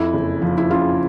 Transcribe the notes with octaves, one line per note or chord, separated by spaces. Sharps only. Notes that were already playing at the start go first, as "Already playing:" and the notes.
Already playing: F2 E4
F#1
F3
E4
C#3 F4